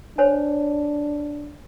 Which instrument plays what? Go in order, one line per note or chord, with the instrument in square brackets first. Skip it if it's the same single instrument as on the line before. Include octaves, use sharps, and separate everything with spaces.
[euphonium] D4 [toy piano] C5 C#5 G#5